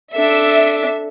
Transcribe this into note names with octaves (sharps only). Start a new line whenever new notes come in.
D4 A4 E5